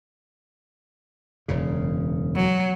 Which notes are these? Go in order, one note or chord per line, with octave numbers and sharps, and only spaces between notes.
E1 F#2 C#3
F#3